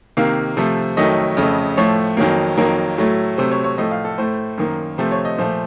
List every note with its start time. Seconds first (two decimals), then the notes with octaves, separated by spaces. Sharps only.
0.17 C3 D#3 A#3 F5
0.57 C3 F3 A3
0.97 F2 D#3 F#3 A3 D#5
1.37 F2 C#3 A3
1.77 A2 F3 A3 C#5
2.17 F2 D#3 F#3 A#3
2.57 F2 D#3 F#3 A#3 A#4
2.98 A2 F#3 A3
3.38 C3 F#3 A3 C5
3.51 C#5
3.64 C#5
3.78 A2 F3 A3 D#5
3.91 F5
4.05 A4
4.18 A2 A3 C5
4.58 F#2 D#3 A#3
4.98 C3 F3 A3 C5
5.12 C#5
5.25 D#5
5.38 A#2 F3 A3 C5